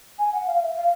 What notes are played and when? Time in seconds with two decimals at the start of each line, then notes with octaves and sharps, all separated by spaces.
0.18 G#5
0.32 F#5
0.46 F5
0.61 E5
0.75 F5